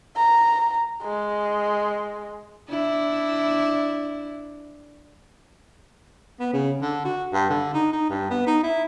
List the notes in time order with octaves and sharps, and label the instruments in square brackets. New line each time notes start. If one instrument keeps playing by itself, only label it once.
[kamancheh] A#5
G#3
[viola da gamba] D4 E4
[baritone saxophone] B3
C#3
D3
F#4
G2
D3
D#4
D#4
G2
B3
D#4
E4